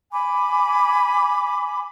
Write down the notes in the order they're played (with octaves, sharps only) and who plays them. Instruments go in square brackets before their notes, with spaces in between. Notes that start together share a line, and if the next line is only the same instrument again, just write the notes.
[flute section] G#5 B5 D6